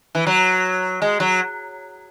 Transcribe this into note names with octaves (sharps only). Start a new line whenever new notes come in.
E3
F#3
G#3
F#3